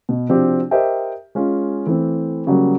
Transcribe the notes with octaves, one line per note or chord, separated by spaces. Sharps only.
B2
C3 F3 C4 D4 F#4 G4
G4 A#4 C5 D#5 E5 G5
G#3 C#4 F4
E3 A3 C4
C#3 F#3 G3 A#3